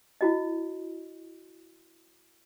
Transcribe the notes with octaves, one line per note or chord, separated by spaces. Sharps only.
E4 F#4 D#5